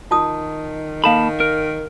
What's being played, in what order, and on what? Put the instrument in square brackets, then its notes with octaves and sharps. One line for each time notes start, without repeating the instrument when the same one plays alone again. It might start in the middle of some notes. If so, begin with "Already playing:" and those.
[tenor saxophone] D#3 [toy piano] F4 A5 D#6
[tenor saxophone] D#3 [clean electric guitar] A#3 A5 B5 [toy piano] A4 F5
[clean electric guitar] A#4